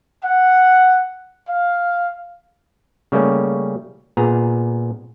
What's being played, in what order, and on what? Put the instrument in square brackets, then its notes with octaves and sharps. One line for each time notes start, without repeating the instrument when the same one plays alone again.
[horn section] F#5
F5
[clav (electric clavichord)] C#3 G3 A3 A#3 C#4
A#2 B3 G#4 A#5